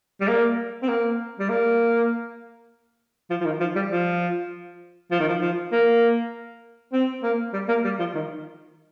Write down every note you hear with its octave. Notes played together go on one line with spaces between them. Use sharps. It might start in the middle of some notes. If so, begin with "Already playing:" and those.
G3
A#3
C4
A#3
G3
A#3
F3
F3
D#3
F3
G3
F3
F3
D#3
F3
F3
A#3
C4
A#3
G3
A#3
G3
F3
D#3